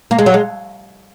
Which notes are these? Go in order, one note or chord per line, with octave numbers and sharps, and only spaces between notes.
A#3
G#3
F#3
G#3